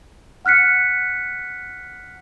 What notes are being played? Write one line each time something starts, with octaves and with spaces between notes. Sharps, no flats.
F#5 F6 F#6 B6 C#7